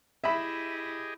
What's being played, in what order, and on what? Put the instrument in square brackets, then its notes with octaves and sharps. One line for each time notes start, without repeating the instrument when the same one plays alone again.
[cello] E4 [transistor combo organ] G4 G#4 D#5 [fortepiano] E5 B5